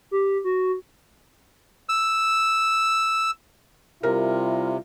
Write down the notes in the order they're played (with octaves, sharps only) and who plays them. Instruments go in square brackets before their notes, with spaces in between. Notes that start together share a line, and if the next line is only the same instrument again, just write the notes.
[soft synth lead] G4
F#4
[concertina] E6
[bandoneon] C3 [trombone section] G3 E4 F4 [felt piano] A#4